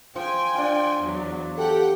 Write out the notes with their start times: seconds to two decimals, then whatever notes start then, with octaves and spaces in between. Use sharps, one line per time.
0.16 F3 G5 G#5
0.55 D4 F4
1.01 E2 F#3
1.58 G4 A4 F#5 G5